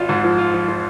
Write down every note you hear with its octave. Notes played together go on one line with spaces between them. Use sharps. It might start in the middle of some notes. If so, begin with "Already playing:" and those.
Already playing: G#1 F4
G#2
F3
F4
F3
F3